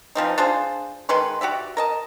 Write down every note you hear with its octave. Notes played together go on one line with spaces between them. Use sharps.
E3 F3 C4 D#4
D4 F4 G#4 C5
D#3 G#3 B4 C6
F#4 G4 D5 E5
A#4 D#5 A5